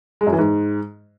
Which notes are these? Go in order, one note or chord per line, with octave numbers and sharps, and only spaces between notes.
G#3
F#2
E3
G#2